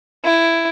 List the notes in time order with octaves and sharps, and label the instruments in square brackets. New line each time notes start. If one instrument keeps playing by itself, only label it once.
[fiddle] E4